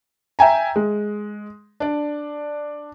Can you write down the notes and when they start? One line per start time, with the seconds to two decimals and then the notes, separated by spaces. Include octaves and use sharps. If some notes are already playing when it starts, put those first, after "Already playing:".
0.39 E5 G5 G#5 A#5
0.76 G#3
1.80 D4 D5